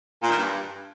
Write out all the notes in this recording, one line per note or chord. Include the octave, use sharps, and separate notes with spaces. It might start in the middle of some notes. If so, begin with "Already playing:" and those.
A#2
D#3
G2